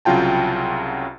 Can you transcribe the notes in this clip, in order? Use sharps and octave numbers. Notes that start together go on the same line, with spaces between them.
C2 C#3 F#3 F4 G5 A5